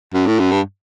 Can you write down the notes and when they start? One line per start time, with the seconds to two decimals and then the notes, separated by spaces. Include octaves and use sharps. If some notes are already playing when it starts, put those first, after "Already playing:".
0.14 F#2
0.27 A2
0.39 F#2
0.52 G2